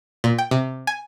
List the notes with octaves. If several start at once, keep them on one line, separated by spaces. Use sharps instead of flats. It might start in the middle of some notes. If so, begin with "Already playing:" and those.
A#2
G5
C3
G#5